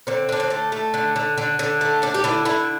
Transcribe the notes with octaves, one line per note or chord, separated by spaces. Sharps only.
D3 C4
D3 D4
C4
A3
A3
D3
D3
D3
D3
A3
A3 D4
G4
D3 E4
D3 E4